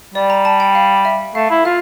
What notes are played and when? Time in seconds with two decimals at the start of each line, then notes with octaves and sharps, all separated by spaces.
0.15 G3 D5
0.30 A#5
0.45 A5
0.60 G5
0.75 F5
1.05 E5
1.35 A3 F5
1.50 E4
1.65 F4 F5